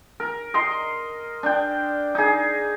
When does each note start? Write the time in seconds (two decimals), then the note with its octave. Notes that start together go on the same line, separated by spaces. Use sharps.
0.20 A#4
0.54 D#5 A#5 C6
1.43 D4 G5
2.15 D#4 G#4